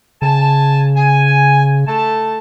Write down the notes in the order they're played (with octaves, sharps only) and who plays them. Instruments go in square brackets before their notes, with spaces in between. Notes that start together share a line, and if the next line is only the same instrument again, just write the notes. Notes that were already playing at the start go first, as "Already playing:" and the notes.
[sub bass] C#3 [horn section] G#5 A5
[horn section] G#5
A3 A5